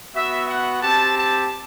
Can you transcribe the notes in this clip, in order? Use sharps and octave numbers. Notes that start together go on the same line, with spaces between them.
B3 F#4 E5
F#5
C4 G4 A5
A5